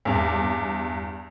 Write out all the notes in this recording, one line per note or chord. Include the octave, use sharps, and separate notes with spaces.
E2 G2